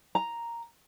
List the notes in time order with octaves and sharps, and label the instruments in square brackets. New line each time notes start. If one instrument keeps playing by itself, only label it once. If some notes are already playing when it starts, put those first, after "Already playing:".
[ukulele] A#5